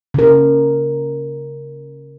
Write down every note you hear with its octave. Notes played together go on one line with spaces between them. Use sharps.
C#3 A#4